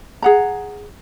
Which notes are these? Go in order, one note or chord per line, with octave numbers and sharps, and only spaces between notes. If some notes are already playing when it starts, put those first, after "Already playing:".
G#4 F#5 A#5